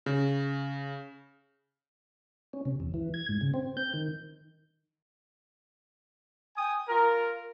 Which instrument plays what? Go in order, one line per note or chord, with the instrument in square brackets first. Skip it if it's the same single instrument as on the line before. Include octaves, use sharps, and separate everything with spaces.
[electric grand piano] C#3
[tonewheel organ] C#4
C3
E2
E3
G#6
G#2
C#3
C4
G6
D#3
[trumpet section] G5 G#5 D#6
F4 A#4